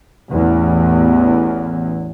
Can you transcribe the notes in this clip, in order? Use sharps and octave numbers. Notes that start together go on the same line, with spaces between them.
A1 E2